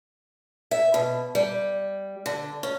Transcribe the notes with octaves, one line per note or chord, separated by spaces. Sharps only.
E5
B2
G3
D3
C#4